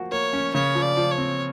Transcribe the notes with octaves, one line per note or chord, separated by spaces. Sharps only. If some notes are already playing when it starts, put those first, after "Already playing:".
Already playing: F3 A#3 F#4
A#3 C#5
C#4
C#3 C#5
F3
D5
F3
C#5
C4